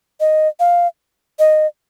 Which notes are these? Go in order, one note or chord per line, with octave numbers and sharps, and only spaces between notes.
D#5
F5
D#5